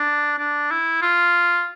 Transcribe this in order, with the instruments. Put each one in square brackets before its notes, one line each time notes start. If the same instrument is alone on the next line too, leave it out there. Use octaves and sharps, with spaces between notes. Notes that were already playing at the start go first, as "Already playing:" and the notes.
Already playing: [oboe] D4
D4
E4
F4